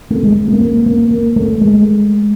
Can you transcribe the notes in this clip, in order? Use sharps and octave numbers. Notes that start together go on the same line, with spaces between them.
A3
G#3
A#3
A#3
A#3
A#3
A3
G#3